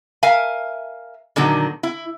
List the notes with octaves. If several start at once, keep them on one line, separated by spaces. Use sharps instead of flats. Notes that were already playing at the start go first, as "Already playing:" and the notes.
A#4 E5 F5 G#5
A#2 D3 D#3 F#3
E4